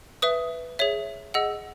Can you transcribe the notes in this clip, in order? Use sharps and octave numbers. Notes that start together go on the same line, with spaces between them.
B4 E5 D#6
G#4 C#5 E5
G#4 D#5 F#5 E6